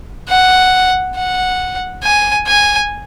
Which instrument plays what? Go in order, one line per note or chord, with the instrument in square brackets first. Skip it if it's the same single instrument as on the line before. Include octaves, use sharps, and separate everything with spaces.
[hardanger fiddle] F#5
F#5
G#5
G#5